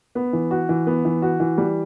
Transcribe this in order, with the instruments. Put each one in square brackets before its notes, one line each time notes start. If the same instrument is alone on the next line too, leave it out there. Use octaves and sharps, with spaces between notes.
[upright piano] B3
E3
F#4
E3
B3
E3
F#4
E3
G3